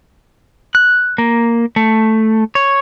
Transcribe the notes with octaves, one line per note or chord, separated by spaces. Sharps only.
F#6
A#3
A3
C#5